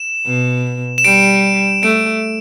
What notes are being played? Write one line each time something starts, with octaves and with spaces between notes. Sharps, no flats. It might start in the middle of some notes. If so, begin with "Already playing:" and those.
Already playing: E7
B2
E7
G3 D7
A3 D7